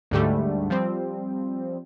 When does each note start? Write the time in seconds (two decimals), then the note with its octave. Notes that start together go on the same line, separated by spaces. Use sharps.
0.11 D2 G#2 D3 G3 A3
0.70 F3 G3 C4